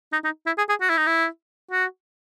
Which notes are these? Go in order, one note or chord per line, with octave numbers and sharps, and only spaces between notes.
D#4
D#4
E4
G#4
G#4
F#4
E4
D#4
E4
F#4